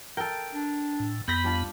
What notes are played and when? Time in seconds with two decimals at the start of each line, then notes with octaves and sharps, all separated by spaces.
0.17 A4 A#4 G5
0.52 D4
1.00 A2
1.28 F2 B3 B5 G6 A#6 B6
1.44 G3 D4 F4